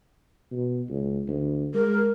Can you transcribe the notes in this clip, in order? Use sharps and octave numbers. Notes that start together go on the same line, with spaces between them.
B2
C#2
D2
G#3 A#4